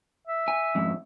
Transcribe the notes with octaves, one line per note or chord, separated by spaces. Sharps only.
E5
G#5
F2 G#2